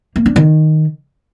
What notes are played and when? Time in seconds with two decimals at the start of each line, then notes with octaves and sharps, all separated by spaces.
0.16 A#3
0.26 D4
0.36 D#3